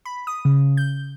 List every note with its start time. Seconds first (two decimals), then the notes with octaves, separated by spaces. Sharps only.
0.05 B5
0.27 D#6
0.45 C#3
0.77 G6